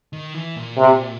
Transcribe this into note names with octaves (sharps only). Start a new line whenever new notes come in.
D#3
E3
A#2
C3